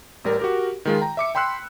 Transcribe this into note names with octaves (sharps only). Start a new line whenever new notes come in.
A1 G3 A#4
F#4 G4 A#4
D#3 G#3 F4
G5 A#5
E5 D6 C#7
G5 B5 C6 E6 F#6